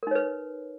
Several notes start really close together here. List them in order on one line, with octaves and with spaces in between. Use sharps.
A#4 D#4 C#5 B4